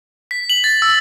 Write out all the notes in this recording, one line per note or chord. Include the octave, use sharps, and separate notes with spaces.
B6
F#7
A6
E6